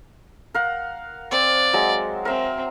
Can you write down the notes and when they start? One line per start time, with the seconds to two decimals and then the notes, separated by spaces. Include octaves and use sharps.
0.54 A#4 F5 F#5
1.31 C4 D5
1.73 F#3 G#3
2.25 C4 A#4 E5